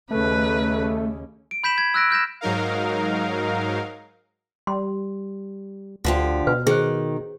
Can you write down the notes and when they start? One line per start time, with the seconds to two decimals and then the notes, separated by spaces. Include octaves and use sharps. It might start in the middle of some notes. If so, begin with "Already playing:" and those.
0.11 D#2 C#3 A3 B4
1.51 D7
1.64 B5 G6 B6 E7 F#7
1.78 G#6
1.94 E6 F#6 A#6 D7
2.10 F6 G6 A#6 E7
2.41 G#2 F#3 D#4 A#4 F5
4.67 G3 C6
6.04 D2 D3 F3 G4
6.47 B2 B4
6.67 D#3 G#4 C5